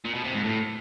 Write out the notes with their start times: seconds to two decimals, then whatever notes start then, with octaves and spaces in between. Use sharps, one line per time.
0.05 A#2
0.14 B2
0.24 C3
0.34 G#2
0.44 A2